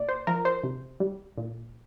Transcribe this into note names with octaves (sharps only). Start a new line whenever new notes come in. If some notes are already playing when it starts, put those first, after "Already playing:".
Already playing: A#2 D5
C5
F3 A#4
C5
C3
G3
A#2